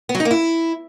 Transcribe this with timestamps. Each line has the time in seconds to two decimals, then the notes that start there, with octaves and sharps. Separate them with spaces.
0.09 B3
0.15 F#3
0.20 D#4
0.25 A#3
0.31 E4